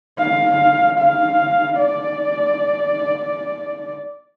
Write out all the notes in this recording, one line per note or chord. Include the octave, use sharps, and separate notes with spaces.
F5
F5
D5